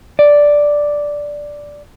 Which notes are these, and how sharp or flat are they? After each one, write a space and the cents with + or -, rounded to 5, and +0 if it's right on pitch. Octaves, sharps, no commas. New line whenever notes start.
D5 +0